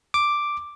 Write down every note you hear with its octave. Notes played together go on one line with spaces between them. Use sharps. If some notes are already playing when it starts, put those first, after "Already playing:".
D6